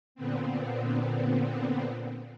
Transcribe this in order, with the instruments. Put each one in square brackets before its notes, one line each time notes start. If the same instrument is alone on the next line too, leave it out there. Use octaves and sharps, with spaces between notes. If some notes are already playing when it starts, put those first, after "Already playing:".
[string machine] A#2 D3 B3 C4